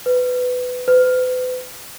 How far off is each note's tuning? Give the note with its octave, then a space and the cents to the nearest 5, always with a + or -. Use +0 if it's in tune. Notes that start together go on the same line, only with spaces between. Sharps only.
B4 +15
B4 +40